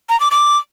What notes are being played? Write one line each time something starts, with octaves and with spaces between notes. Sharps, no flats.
A#5
D6
D6